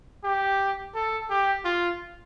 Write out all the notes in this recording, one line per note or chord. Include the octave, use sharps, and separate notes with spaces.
G4
A4
G4
F4